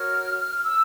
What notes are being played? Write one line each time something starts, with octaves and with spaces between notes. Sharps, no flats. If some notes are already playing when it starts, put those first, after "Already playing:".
Already playing: F#4 A#4 C#5 F6
E6